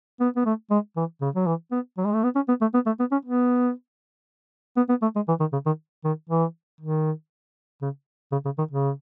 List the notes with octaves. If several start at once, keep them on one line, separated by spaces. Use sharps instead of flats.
B3
B3
A3
G#3
E3
C#3
F#3
E3
B3
F#3
G#3
A3
B3
C#4
B3
A3
B3
A3
B3
C#4
B3
B3
B3
A3
G#3
E3
D#3
C#3
D#3
D#3
E3
D#3
C#3
C#3
C#3
D#3
C#3